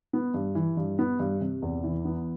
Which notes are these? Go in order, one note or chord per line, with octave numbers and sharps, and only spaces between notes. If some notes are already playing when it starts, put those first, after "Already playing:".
B3
G2
E3
G2
B3
G2
C3
E2
E3
B3